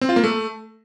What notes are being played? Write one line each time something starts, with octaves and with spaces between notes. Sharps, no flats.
C4
F4
A#3
A3